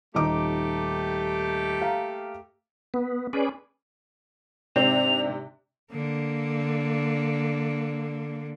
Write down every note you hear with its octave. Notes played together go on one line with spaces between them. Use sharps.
D#1 A3 A#3 D#4 G4 D6
F5 A#5
B3
C#4 G#4 B4 D5
G#2 C3 C4 D4 F7
D3 A#3